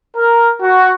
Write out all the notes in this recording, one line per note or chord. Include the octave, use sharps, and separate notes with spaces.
A#4
F#4